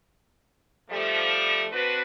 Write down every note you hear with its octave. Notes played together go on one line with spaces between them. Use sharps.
F3 G3 A3
C4 D4 F#4 B4